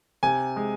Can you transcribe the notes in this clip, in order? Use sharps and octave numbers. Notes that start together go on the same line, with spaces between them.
C3 G#5
G#3